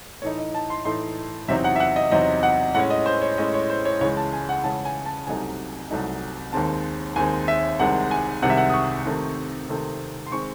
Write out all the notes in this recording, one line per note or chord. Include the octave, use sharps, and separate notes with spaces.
A2 E3 A3 D#4 C#5
D#5
A5
C6
A2 E3 A3 D#4 C6
E2 C3 F#3 C4 D#4 E5
F#5
E5
F#5
D#5
E2 C3 F#3 C4 D#4 D#5
F#5
A2 G#3 C#4 F#5
D#5
C5
C#5
A2 G#3 C#4 D#5
C#5
C5
C#5
C#2 C#3 E3 G#3 C#5
A5
G#5
F#5
C#2 C#3 E3 G#3 A5
G#5
A5
C2 C3 F#3 A3 D#4 G#5
C2 C3 F#3 A3 D#4
D#2 D#3 G#3 C4 A5
D#2 D#3 G#3 C4 G#5
E5
C2 C3 D#3 G#3 F#5
G#5
C2 C3 D#3 G#3 F#5
E5
F#5
D#6
C#6
C3 D#3 A3 C4
C3 D#3 A3 C4
C6
D#3 G#3 C4 C#6